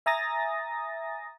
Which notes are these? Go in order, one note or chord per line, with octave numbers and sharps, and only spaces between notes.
E5 G#5 A#5 D#6 A6 A#6